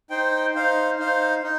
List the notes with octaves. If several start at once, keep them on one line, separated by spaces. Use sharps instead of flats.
D#4 C5 G5
D#4 C5 F5
D#4 C5 F5
D#4